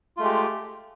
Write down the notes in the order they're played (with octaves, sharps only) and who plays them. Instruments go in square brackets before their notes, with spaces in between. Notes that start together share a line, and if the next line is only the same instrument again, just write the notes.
[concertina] F4
A3
G#3
G4